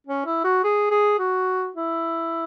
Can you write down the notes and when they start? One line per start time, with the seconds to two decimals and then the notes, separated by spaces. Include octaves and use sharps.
0.07 C#4
0.26 E4
0.44 F#4
0.64 G#4
0.91 G#4
1.19 F#4
1.76 E4